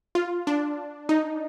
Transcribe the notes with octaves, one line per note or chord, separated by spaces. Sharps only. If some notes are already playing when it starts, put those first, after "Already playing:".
F4
D4
D#4